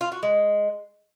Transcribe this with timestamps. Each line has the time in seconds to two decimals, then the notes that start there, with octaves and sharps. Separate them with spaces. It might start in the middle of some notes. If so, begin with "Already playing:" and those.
0.01 F4
0.12 F#4
0.23 G#3